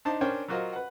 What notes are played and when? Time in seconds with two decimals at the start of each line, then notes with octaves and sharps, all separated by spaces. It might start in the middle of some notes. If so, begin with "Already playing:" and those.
0.05 D4 D#4 C5 A5
0.21 C#4 D4 A#4 C5 C#5 G5
0.48 F#3 F4 F#4 A#4 C5 D#5
0.73 B4 F#5